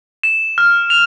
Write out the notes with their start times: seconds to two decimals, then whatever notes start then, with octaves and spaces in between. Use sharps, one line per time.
0.23 E7
0.58 F6
0.90 F7